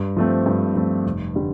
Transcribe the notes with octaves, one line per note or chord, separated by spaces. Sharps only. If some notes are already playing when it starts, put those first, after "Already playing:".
Already playing: G2
F3 A3 C4
G2
F3 A3 C4
F1
D3 G3